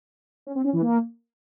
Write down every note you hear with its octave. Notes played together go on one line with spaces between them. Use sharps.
C#4
C4
C#4
E3
A#3